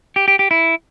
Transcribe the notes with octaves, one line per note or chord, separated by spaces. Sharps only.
G4
G4
G4
E4